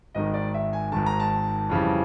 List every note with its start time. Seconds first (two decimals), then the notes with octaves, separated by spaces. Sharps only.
0.15 G#1 G#2 D#3 D#5
0.34 D5
0.54 E5
0.73 G#5
0.92 G#1 G#2 D#3 A5
1.06 A#5
1.20 A5
1.69 F2 C#3 E3 G3